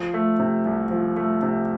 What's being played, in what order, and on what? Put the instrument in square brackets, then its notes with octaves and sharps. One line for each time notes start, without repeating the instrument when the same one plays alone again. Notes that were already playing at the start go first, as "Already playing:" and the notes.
Already playing: [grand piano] F3
A3
C3
C2
F3
A3
C3